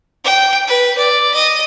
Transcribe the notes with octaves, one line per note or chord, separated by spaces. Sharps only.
G5
B4
D5
D#5